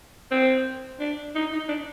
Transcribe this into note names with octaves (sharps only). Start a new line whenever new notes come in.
C4
D4
D#4
D#4
D4